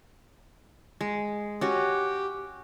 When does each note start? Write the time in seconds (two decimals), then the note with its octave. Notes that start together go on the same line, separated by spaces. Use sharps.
1.01 G#3
1.61 C#4 F#4 G4